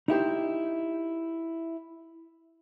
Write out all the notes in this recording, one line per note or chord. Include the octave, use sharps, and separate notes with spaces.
D#4 E4 G4 C5